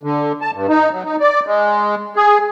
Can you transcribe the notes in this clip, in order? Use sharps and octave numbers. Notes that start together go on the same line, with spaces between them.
D3
A5
G2
D#4
F#3
D#4
D5
G#3
G#4